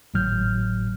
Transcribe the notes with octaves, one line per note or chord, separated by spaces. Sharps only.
G#1 A2 F#3 F6 G6